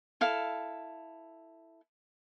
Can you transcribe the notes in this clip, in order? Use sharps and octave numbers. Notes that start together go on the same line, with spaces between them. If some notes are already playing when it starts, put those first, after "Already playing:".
E4 A4 F5